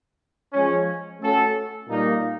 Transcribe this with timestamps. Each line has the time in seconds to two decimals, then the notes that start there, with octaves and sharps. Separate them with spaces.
0.52 F3 G#3 C#4
1.20 A3 C#4 F#4 A4
1.88 A#2 G3 A#3 D#4